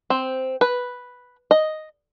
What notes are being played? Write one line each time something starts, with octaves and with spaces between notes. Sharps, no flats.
C4
B4
D#5